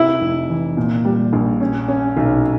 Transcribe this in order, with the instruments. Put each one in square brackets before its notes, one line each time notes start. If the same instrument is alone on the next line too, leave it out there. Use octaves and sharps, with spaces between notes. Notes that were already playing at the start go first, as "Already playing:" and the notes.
Already playing: [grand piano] C3 [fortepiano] E4
[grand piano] F1
E3
A#2
G3
A#1
C#4
C#4
B1